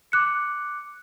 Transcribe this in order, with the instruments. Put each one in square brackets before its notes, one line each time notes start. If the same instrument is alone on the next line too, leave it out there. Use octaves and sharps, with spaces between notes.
[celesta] D6 F#6 C#7